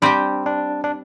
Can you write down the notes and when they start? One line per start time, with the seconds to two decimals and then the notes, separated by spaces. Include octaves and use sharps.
0.02 G3 C4 D4 G4
0.46 D4
0.84 D4